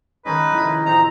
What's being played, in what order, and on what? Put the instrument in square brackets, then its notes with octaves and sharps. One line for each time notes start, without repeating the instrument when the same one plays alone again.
[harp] C#2 D#3 [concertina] C#4 D#4 D#5 [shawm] B4
[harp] F1 E4
[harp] A1 F4 [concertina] C4 D#4 [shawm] A#5